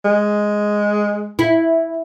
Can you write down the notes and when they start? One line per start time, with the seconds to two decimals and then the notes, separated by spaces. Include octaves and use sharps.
0.04 G#3
1.39 E4